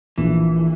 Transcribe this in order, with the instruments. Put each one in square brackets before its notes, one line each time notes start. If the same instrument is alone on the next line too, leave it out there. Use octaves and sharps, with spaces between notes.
[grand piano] A#1 [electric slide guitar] E3